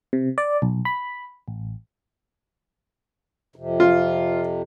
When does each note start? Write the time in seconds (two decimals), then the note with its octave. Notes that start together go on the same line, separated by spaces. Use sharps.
0.13 C3
0.38 D5
0.62 B1
0.85 B5
1.48 A1
3.56 F2 C3
3.80 F4